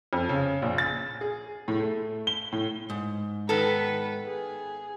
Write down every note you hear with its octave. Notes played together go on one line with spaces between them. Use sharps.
F2
C#3
A#1
A6
G#4
A2
A3
G7
A2
G#2
D#3 B3 A4 B4
G#4